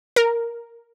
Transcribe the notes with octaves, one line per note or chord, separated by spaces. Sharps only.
A#4